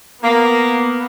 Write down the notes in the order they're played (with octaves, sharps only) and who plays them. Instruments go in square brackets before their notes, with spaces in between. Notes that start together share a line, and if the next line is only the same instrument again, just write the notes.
[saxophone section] A#3 [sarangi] B3